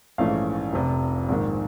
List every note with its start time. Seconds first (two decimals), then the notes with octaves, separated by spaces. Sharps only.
0.18 A#1 G#2 E3 A3 C#4 F5
0.73 F1 F2 C3
1.28 A#1 G#2 D#3